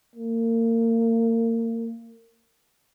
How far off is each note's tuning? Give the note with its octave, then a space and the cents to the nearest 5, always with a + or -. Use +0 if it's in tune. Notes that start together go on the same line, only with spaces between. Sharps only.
A#3 -30